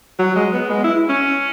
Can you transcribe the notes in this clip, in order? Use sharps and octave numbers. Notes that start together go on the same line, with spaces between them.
F#3
G#3
B3
G#3
E4
C#4